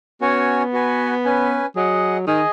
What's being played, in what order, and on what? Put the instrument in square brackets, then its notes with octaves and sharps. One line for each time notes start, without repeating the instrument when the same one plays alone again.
[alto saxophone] B3 [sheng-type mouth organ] C#4 F#4 C#5 G#5
[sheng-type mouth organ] F#4 B4 G#5
C#4 B4 G#5
[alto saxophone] F#3 [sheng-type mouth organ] G#4 D#5 F#5
[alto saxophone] D#3 [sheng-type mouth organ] G#4 D#5 G#5